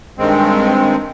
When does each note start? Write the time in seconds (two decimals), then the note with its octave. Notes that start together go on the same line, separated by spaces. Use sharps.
0.17 G2 D#3 G#3 C4